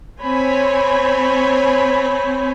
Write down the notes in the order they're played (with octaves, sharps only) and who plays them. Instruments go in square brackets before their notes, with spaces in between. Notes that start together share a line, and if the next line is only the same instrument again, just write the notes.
[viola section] C4 C5 C#5 G#5 B5